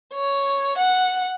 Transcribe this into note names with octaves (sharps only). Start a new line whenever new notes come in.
C#5
F#5